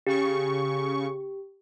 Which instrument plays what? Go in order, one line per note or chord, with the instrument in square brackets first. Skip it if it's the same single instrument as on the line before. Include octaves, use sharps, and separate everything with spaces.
[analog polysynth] C#3 C#6 [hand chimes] G4